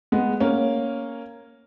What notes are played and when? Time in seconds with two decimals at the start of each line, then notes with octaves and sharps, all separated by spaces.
0.12 G#3 B3
0.40 A#3 C#4